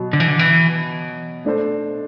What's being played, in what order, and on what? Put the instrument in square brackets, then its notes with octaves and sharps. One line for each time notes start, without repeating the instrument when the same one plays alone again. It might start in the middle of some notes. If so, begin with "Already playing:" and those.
Already playing: [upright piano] B2 F#3 B3
[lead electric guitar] D3
E3
D3
E3
[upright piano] A3 D4 A4 C5